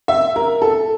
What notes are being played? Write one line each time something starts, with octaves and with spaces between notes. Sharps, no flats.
E5
A#4
A4